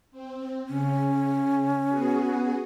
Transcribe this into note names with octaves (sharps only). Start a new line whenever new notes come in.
C4
C#3 C#4
B3 F#4 G#4